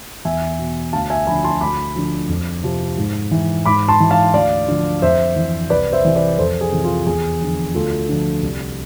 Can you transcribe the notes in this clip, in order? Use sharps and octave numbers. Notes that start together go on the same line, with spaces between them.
E2 E5 G#5
B2
D2 F5 A5
E5 G#5
D3 F3 G#5 B5
A5 C6
D2 B5 D6
D3 F3
F2
C3 F3
G#2
E3
G#2 B5 D6
A5 C6
E3
F5 A5
D2 D5 F5
D3 F3
F2 C5 E5
E3
C2 B4 D5
C5 E5
C3 E3
B4 D5
F2 A4 C5
G#4
C3 E3
F4
E2 G#4
D3 F3
D2 F4 A4
D3 F3
C2